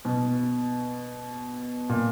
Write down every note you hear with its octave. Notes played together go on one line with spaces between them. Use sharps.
B2
A#2